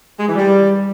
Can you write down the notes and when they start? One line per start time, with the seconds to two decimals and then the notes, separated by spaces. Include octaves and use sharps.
0.19 G#3
0.27 E3
0.35 G3